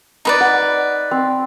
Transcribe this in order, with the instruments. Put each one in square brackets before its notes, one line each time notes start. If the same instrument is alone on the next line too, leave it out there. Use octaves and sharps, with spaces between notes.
[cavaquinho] D#4 B4 D5
[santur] F#5
C4